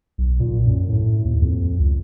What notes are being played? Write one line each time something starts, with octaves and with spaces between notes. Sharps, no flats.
B1
A#2
F#2
A2
D#2
F2
C#2